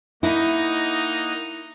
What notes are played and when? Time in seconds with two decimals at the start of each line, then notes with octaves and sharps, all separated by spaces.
0.23 A#3 D#4 E4 D#5 F#5